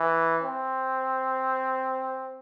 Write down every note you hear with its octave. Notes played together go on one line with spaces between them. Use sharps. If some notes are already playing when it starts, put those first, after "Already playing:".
Already playing: E3
C4